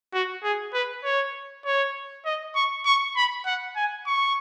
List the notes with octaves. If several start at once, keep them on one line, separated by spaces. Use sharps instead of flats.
F#4
G#4
B4
C#5
C#5
D#5
C#6
C#6
B5
F#5
G#5
C#6